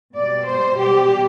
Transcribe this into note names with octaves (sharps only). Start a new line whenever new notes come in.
B2 G3 D5
C5
B2 G3 G4